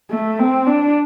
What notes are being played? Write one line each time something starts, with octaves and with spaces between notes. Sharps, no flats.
A3
C4
D4